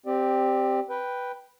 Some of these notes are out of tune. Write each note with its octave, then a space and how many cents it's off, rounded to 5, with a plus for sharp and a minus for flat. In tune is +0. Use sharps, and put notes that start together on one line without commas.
C4 +0 G4 +0 D5 +20
B4 +0 G5 +0